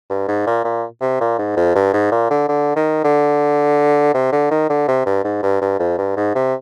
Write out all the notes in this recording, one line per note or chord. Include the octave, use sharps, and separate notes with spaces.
G2
G#2
A#2
A#2
C3
A#2
G#2
F2
G2
G#2
A#2
D3
D3
D#3
D3
C3
D3
D#3
D3
C3
G2
G#2
G2
G2
F2
G2
G#2
C3